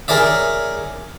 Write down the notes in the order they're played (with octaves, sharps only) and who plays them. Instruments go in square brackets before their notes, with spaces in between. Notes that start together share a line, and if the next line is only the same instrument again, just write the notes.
[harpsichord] G#4 A#4 C#5 D5 E5